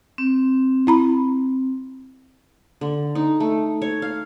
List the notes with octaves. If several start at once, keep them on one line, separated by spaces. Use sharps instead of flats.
C4
E4 A#5 B5
D3
D#4
A3
C#5
F5